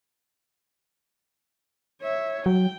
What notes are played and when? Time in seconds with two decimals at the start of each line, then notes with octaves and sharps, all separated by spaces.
2.01 C#5 E5
2.46 F#3 G5